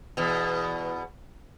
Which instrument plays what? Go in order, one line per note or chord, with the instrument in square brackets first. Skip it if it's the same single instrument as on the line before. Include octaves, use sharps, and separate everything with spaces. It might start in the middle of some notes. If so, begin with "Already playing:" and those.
[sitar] E2 B2